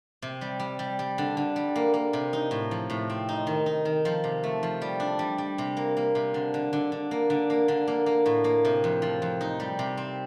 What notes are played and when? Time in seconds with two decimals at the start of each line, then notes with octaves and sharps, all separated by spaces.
0.22 C3
0.41 G3
0.60 G3
0.79 G3
0.99 G3
1.18 D3
1.37 D3
1.56 G3
1.76 A#3
1.94 A#3
2.13 C3
2.33 D#4
2.51 A2
2.71 F3
2.90 A2
3.10 C4
3.29 D#4
3.47 D#3
3.66 D#4
3.85 D#3
4.05 F3
4.24 C3
4.44 A3
4.63 F3
4.82 G3
5.00 D4
5.19 G3
5.38 G3
5.58 C3
5.77 A#3
5.97 A#3
6.15 C3
6.34 D3
6.54 D3
6.73 D3
6.92 D3
7.11 A#3
7.30 D3
7.50 A#3
7.68 D3
7.88 A#3
8.06 A#3
8.26 A2
8.44 A#3
8.65 C3
8.84 F2
9.02 F3
9.22 F2
9.41 D#4
9.60 G3
9.79 C3
9.97 C4